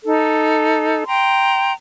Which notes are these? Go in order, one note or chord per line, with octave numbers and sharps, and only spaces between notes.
D#4 A4
G5 A#5 C6